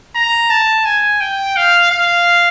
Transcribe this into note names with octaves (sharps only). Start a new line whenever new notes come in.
A#5
A5
G#5
G5
F5
F5